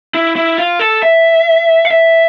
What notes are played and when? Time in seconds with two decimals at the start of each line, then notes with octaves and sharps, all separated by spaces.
0.14 E4
0.36 E4
0.58 F4
0.80 A4
1.03 E5
1.85 F5
1.91 E5